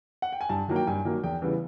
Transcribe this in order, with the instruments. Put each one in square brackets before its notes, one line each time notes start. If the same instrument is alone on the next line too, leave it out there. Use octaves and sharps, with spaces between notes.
[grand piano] F#5
G5
G#5
G2 A5
D#3 F#3 A#3
G5
G2 G#5
D#3 F#3 A#3
E2 G5
C#3 E3 G3 B3